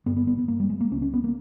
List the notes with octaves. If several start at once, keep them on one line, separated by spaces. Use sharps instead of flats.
G1 G2 B3
B3
B3
B3
A#3
G3
G#3
A#3
C#2 C#3 C#4
C#4
B3
A#3